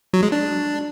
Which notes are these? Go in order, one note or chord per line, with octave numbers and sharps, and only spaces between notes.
F#3
G#3
D4